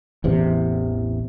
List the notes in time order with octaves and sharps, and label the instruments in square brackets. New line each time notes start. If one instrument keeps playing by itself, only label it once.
[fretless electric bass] A1 E2 C3